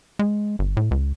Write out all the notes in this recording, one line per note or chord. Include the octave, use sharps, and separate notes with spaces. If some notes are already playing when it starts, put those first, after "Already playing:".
G#3
G1
A2
C#2